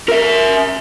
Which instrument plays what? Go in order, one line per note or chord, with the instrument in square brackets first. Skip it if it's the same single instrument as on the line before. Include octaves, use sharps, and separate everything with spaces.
[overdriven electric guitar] A#4 E5